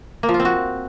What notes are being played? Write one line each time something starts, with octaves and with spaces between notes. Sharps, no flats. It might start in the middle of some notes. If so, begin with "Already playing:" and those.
A#3
F3
F4
C4
F#4